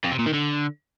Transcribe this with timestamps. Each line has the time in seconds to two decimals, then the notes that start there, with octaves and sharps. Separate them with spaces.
0.04 F2
0.11 C3
0.19 A#2
0.26 D#3
0.34 D3